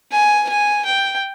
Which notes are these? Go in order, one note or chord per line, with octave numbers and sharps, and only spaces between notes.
G#5
G#5
G5